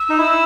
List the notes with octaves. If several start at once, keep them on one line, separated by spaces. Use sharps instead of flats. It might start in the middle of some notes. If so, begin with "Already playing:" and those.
Already playing: E6
D#4
E4